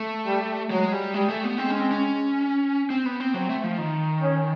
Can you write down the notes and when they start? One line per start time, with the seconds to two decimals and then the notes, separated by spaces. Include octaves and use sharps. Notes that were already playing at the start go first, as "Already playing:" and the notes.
Already playing: A3
0.27 G3
0.71 F#3 G#3
0.92 G3
1.14 G3 G#3
1.29 A3
1.44 B3
1.58 G#3 C4
1.70 C#4
1.81 C4
1.91 C#4
2.90 C4
3.06 B3
3.20 C4
3.34 F#3 C4
3.50 A3
3.64 F3
3.78 D#3
4.22 C#4